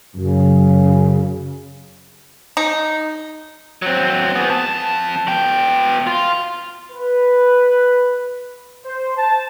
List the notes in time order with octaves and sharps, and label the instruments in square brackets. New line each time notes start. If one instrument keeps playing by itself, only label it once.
[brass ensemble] F#2 [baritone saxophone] C#3
[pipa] D#4
[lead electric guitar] F#3 C4
B3 G#4
F2 A5
B2 G5
F4
[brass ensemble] B4
C5
A5